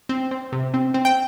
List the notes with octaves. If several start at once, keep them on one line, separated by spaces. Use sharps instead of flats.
C4
C4
C3
C4
C4
G5